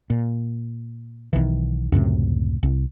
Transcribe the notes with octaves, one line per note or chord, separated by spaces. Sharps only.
A#2
B1 D#3 E3
C#2 F#2 A2 C3
C2